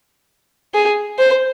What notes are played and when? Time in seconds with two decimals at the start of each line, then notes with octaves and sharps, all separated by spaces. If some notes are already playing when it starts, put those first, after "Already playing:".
0.74 G#4
1.19 C5